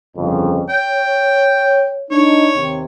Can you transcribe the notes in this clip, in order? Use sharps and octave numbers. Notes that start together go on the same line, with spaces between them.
G1 F2 C#3
C#5 G5
D4 D#4 C#5
D#2 C3